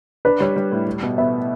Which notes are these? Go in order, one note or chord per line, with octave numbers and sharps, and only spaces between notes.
D4 B4
G3 C#5
G3
A2
G3
B2
B3 E5